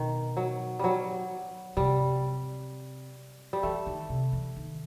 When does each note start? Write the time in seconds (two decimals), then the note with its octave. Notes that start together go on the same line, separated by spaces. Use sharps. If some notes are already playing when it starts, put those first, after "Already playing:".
Already playing: B2 D#3
0.37 F#3
0.79 F#3 G3
1.77 C3 G3
3.53 G3
3.63 E3 A3
3.87 D#3
4.10 C3
4.33 E3
4.57 D#3